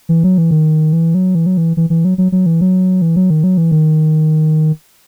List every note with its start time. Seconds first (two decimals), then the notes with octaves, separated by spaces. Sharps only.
0.09 E3
0.24 F#3
0.38 E3
0.51 D#3
0.93 E3
1.15 F#3
1.35 E3
1.46 F#3
1.57 E3
1.77 E3
1.90 E3
2.05 F#3
2.18 F#3
2.32 F#3
2.46 E3
2.61 F#3
3.02 E3
3.16 F#3
3.30 D#3
3.44 F#3
3.57 E3
3.71 D#3